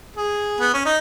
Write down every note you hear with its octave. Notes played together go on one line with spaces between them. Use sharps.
G#4
B3
C#4
D#4